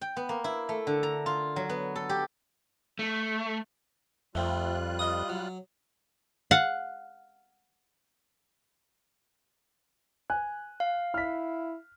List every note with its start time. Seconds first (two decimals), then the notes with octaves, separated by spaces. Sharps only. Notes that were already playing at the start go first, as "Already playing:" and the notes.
0.01 G5
0.17 B3
0.29 A#3
0.44 E4
0.69 A3
0.87 D3
1.03 A#5
1.26 F4
1.56 F#3
1.69 B3
1.96 A4
2.09 G4
2.99 A3
4.35 F2 G3 A3 C4 F4 F#6
4.99 D#5 D#6
5.29 F#3
6.51 F5 F#5
10.30 G#5 F#6
10.80 F5
11.14 E4 F6 B6